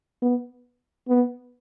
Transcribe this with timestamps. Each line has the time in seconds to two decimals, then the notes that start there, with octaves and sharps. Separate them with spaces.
0.22 B3
1.09 B3